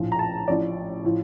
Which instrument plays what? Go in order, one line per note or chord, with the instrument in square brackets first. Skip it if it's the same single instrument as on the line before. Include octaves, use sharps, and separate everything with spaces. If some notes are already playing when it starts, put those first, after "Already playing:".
Already playing: [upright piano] A#1 A2 F3
A#5
A5
A1 A2 F3 D5
A2 F3